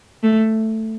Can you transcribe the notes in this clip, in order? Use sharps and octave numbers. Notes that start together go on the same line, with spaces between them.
A3